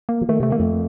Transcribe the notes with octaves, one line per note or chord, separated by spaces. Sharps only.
A#3
F3
D#3 A3
C3 A3
D#3 A#3
F2 A3